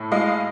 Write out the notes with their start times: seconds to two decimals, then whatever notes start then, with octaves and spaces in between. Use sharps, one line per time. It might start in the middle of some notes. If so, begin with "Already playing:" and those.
Already playing: A2
0.12 G#3 D#5 F5